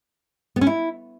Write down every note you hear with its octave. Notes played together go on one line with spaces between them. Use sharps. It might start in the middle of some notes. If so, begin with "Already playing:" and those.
B3
C#4
E4